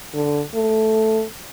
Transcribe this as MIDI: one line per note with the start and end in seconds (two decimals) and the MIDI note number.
0.14 0.42 50
0.55 1.24 57